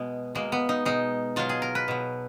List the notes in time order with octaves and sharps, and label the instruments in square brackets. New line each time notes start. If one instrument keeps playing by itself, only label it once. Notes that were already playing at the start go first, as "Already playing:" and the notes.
Already playing: [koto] B2 G#3 B3
B2 G#3 A#3
B3
D#4
B2 G#3 D#4
B2 F#3 F4
G#4
A#4
B4
B2 F#3